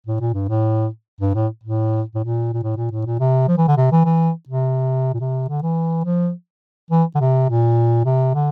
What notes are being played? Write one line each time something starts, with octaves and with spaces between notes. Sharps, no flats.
A2
A#2
G2
A2
G2
A2
A2
A2
A#2
A#2
A2
A#2
A2
A#2
C3
F3
E3
D3
C3
E3
E3
C3
A#2
C3
D3
E3
F3
E3
D3
C3
A#2
C3
D3